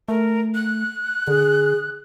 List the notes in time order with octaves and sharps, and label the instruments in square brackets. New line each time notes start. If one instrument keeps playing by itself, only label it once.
[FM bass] A3 [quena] A#4
[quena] F#6
[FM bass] D3 [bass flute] G#4